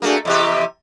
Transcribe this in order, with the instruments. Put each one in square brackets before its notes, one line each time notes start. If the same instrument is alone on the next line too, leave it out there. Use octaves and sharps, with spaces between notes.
[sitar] A3 A#3 [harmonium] D4 F#4 G#4
[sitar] E2 C3 G4 [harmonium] D#5 E5